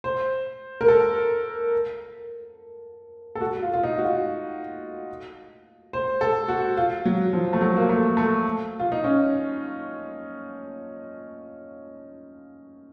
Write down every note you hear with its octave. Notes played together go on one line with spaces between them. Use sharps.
C5
A#4
A4
A4
F#4
F4
F4
D#4
F#4
F4
C5
A4
F#4
F4
F#3
F3
A3
F#3
A#3
A3
A3
F4
D#4
C#4